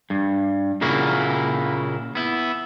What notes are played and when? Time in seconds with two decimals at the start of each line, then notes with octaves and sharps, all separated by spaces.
0.10 G2
0.81 A#2 C#3 A#3 E4 F#4
2.15 B3 E4